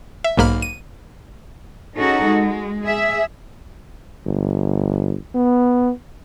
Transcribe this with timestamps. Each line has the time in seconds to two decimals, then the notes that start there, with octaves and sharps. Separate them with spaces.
0.24 E5
0.38 B1 G#2 A#3 B5 F6
0.62 D#7
1.94 C#4 D#4 F#4 G#4 A4
2.27 G#3
2.82 G#4 E5
4.26 G1
5.35 B3